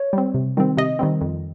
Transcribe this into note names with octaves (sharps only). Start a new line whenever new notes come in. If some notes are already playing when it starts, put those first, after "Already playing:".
Already playing: C#5
G3 C4
C3
D#3 G3 C4
C3 D#5
D#3 G3 C4
F2